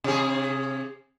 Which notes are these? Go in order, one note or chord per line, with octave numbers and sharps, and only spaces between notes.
C3 G#4